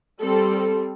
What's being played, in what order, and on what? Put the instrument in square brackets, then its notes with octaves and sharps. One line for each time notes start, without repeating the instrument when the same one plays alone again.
[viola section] G3 C4 A4